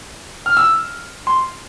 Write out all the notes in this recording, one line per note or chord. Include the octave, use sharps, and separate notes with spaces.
F6
E6
C6